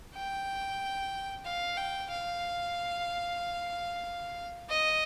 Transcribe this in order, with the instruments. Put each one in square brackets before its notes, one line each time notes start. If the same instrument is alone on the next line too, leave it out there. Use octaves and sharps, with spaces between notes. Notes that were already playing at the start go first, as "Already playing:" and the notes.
[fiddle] G5
F5
G5
F5
D#5